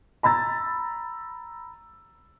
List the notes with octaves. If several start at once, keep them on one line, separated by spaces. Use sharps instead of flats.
A#5 B5 E6 A6